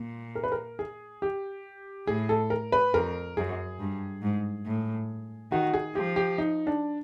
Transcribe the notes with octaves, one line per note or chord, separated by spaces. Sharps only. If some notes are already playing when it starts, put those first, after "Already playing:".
Already playing: A#2
A#4
B4
A#4
G#4
G4
A2 G#4
A4
A#4
B4
F2 A#4
F#2 G#4
G2
G#2
A2
D#3 F#4
G#4
F3 G4
G4
D#4
D4